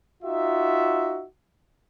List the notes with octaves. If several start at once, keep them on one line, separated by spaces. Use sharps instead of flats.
D#4 F4 F#4 E5